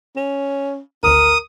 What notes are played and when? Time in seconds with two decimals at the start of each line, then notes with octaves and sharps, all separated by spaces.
0.16 C#4
1.03 G#1 D2 A#4 D#6